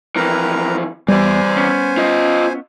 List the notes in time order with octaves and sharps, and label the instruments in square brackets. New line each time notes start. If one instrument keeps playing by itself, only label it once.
[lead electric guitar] F2 E3 [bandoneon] A#4 B4 A#5
[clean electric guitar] E2 [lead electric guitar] E3 D5 [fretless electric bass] G3 [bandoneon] C5 G#5
[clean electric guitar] B3 C#4
[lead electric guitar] F4 D#5